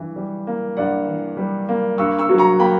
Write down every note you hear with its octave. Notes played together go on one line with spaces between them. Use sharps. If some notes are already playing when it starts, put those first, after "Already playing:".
Already playing: G2 E3
G3
A#3
G2 D5 F#5
E3
G3
A#3
G2 C#6 E6
C#6 E6
F#3
A#5 C#6
A#3 G5 B5